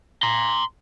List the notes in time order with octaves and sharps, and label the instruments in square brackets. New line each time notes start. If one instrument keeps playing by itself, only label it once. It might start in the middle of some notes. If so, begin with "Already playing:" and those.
[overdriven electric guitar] A#5 C6